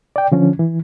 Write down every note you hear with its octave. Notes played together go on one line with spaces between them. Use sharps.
D5 G5
D3 F3 C#4
E3